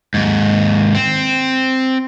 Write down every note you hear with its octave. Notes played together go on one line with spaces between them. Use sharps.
D#2 G#2
C4